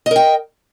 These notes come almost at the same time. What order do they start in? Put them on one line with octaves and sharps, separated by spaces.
D#5 A#4 G5